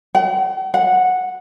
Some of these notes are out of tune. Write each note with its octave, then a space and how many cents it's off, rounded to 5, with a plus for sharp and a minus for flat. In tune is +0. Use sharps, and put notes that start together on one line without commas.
F#5 +45
F#5 -10